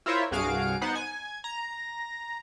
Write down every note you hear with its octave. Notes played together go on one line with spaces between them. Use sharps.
E4 F4 A#4 C5 C#5 E5
C2 G2 F#4 G#4 F5 D7
B3 D#4 C5 F#5
G#5
A#5